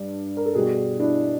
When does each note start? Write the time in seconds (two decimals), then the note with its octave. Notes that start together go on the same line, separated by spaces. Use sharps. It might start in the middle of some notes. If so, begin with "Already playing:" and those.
Already playing: G2
0.37 A#4
0.46 A4
0.54 B2 G3 F#4 G#4
1.00 D4 E4